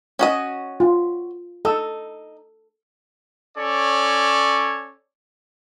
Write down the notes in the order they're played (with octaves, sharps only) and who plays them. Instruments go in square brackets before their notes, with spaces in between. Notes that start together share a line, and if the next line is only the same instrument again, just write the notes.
[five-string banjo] C#4 F#4 D#5
[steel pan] F4
[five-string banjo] D#4 [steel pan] A4 E6
[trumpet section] C#4 A4 C#5 D5